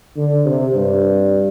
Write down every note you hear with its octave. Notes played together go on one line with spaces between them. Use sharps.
D3
C3
G2